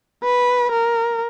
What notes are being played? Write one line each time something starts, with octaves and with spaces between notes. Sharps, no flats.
B4
A#4